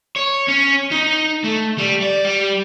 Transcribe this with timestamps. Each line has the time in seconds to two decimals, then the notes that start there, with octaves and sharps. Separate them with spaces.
0.16 C#5
0.48 C#4
0.91 D#4
1.44 A3
1.78 G3
2.02 D5
2.25 G3